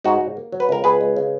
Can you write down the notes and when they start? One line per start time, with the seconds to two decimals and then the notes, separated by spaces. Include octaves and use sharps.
0.04 G#2 D#4 F#4
0.21 G#2
0.37 A#3
0.52 F#3
0.60 B4
0.69 C#2 A#4
0.84 C#2 G#4 B4
1.01 G#3
1.16 C#3